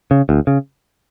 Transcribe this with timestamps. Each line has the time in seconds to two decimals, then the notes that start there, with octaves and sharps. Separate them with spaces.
0.11 C#3
0.29 D2
0.47 C#3